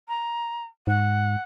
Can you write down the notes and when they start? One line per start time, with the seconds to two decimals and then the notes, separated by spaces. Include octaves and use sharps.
0.08 A#5
0.87 G#2 F#5